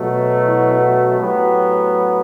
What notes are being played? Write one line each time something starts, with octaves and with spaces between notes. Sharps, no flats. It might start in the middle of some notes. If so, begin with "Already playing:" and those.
Already playing: B2 F#3 A3
E4
F#4
A2 F#3 B3 G4